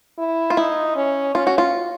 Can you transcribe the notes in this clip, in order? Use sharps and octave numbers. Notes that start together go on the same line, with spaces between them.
E4
F4
D#4 E4
C#4
C#4 F4
F#4
F4